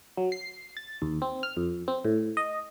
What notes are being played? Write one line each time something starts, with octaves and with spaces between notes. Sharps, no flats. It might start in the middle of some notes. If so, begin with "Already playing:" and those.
F#3
C7
A6
D#2
C4
F6
F2
C4
A2
D#5